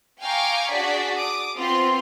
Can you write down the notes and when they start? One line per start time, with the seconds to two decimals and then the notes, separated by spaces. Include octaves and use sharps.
0.24 F5 G5 G#5 A#5 C#6 D6
0.72 D4 F#4 G#4 D5 B6
1.17 D6 D#6
1.57 B3 C4 F4 C6